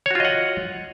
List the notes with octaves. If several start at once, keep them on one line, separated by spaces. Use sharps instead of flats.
F4 F#4 C#5 D#5 F#5